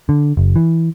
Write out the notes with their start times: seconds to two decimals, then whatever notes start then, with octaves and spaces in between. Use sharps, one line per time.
0.09 D3
0.37 F#1
0.56 E3